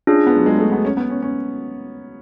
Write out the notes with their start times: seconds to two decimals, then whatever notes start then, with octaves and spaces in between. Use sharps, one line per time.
0.07 C#4 D4 F4 G#4
0.26 B3
0.36 F#3
0.46 G#3
0.58 A3
0.72 B3
0.85 C#4
0.97 B3
1.10 C#4
1.22 C#4